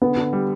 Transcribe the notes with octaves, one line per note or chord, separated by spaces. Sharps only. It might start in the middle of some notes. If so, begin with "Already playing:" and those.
D3 B3
D3
G3